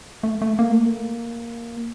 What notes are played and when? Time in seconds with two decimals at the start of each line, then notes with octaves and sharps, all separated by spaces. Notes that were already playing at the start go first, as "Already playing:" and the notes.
0.23 A3
0.42 A3
0.59 A#3
0.72 A3
0.86 A#3